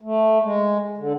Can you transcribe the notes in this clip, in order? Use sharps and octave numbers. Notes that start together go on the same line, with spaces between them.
A3
G#3
D3